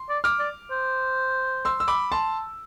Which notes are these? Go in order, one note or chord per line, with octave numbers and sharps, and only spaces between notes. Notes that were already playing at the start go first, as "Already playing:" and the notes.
Already playing: C6
D5
D6 F6
D5
C5
C6 E6
E6
B5 D6
A5 C6